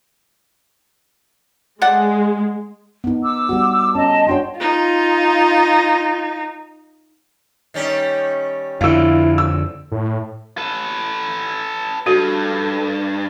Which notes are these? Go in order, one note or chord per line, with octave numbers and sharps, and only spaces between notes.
G#3 A4 D5 F#5
B3 D#4
D6 E6
G3 B3 F#4
C#4 D#4 D#5 A5
D4 F#4 C#5 G5 C6
D#4 F4
D#3 G3 C#4
F2 D3 E4 F5 E6
E6
A2
A4 B4
G2 F#4 A4